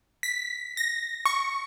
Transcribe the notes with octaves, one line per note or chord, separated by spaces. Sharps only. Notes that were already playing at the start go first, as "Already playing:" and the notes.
B6
A#6
C#6